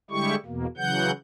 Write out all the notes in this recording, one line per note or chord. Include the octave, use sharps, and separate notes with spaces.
D3 G3 G#3 E4 G4 C#6
E2 B2 A#3
C#3 E3 F#3 F#5 G6